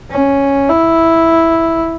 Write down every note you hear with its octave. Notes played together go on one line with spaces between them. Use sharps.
C#4
E4